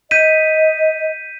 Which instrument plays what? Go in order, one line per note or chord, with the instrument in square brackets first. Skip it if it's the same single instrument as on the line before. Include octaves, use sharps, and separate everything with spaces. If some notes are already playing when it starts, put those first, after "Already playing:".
[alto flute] D#5 [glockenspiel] G6 B6 D#7